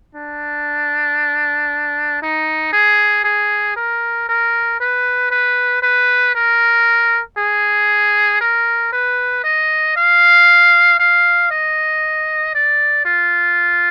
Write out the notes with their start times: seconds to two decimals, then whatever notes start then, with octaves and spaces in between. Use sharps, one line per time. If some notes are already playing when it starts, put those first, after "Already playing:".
0.15 D4
2.22 D#4
2.73 G#4
3.24 G#4
3.77 A#4
4.29 A#4
4.80 B4
5.31 B4
5.82 B4
6.35 A#4
7.38 G#4
8.41 A#4
8.93 B4
9.44 D#5
9.97 F5
10.99 F5
11.51 D#5
12.55 D5
13.05 F4